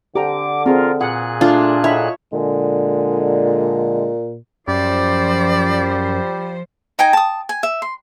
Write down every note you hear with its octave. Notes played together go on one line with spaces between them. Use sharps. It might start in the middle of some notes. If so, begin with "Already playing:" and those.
D3 G4 A#5 D6
C4 F4 G#4 A#4
A#2 G#4 F#5 F#6
A3 D4 F4 F5
A2 D3 D#4 C#5 E5 B5
A#2 D3 G#3
F#2 F3 G3 C5 D5
D#4 G5 G#5 A#5
A5 D#6
G#5
E5
C6